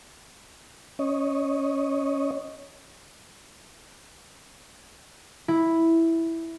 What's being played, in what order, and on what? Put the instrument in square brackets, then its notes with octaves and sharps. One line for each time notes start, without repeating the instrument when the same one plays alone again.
[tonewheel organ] C#4 C#5 D#5
[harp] E4